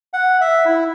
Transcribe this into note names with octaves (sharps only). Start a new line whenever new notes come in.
F#5
E5
E4